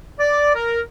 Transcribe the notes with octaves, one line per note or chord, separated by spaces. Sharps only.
D5
A#4